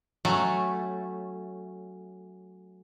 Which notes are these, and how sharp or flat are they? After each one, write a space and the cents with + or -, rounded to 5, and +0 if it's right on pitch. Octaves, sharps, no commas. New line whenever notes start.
F#3 +0 A3 +0 C#4 -10